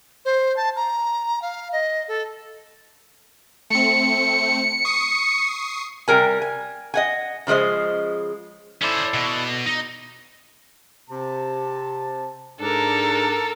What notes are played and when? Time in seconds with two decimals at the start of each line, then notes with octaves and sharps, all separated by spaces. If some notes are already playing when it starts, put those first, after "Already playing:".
0.25 C5
0.57 A5
0.76 A#5
1.42 F5
1.73 D#5
2.08 A4
3.70 A3 C4 C#7
4.85 C#6 D#6 C7
6.08 C3 G3 A#4 G#5
6.42 G#5
6.94 D#5 F#5 G#5
7.47 C#3 F3 G#3 C5 D#5
8.82 C#4 E4 A4 C5 D5
9.14 B2
9.66 D#4
11.10 C3 A5
12.61 G#2 D4 A4 A#4